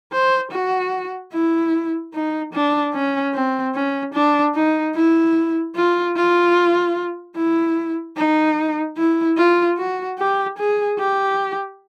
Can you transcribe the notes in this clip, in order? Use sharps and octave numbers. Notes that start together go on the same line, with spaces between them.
C5
F#4
E4
D#4
D4
C#4
C4
C#4
D4
D#4
E4
F4
F4
E4
D#4
E4
F4
F#4
G4
G#4
G4